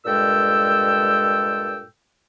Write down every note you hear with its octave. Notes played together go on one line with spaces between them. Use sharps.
G2 A#2 G#3 A4 G5 E6